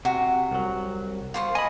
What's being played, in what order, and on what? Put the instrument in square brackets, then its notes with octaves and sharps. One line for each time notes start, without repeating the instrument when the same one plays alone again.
[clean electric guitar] C3 [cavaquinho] F#4
[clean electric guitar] C2 F#3
[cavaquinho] F4 C5 C#6
[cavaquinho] D#5 [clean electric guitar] G#5 B5